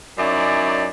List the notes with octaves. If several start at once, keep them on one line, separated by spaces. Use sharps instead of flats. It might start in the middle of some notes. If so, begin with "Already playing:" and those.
F#2 C#4 D#4 E4 D5